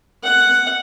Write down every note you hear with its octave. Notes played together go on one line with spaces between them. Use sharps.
F#5